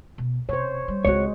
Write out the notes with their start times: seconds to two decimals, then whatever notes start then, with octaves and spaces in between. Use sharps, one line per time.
0.18 B2
0.49 C3 C5 C#5
0.88 G3
1.05 C#2 G#3 C4 F#4 C#5